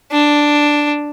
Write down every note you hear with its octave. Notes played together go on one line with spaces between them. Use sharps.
D4